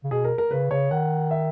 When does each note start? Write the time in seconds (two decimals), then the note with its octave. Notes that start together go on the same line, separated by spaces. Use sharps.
0.04 C#3
0.11 B2 G#4
0.25 A#4
0.38 A#4
0.51 C#3 B4
0.71 C#3 C#5
0.91 D#3 F#5
1.31 E5